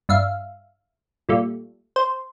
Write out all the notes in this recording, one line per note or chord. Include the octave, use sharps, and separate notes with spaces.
G2 E5 F5
A#2 G3 A3
C5